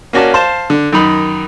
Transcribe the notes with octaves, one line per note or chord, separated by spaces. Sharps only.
A#3 C#4 F#4 D5 A5
C5 F5 A5
D3
F#2 D#3 D#4 B5